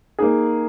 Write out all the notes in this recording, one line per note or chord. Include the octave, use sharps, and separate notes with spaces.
A#3 D#4 G#4